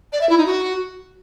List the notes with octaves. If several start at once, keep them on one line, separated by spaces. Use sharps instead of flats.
D5
E5
E4
D#4
F#4